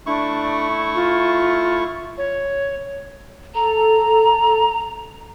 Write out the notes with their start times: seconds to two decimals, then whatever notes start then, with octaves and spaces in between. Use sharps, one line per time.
0.06 A3 D4 E4 C#6
0.95 F4
2.18 C#5
3.55 A4 A#5